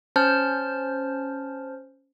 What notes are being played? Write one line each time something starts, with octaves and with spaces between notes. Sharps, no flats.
C#4 C5 A5 F6 G6